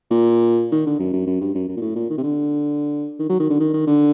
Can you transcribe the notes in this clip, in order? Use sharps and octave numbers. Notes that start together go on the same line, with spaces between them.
A#2
D#3
D3
F#2
F#2
F#2
G2
F#2
F#2
A#2
A2
A#2
D#3
C3
D3
D#3
F#3
D#3
D3
D#3
D#3
D3